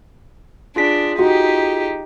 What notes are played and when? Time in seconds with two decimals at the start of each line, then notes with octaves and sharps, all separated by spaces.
0.76 D4 F4 G#4 B6
1.19 D#4 F#4 G4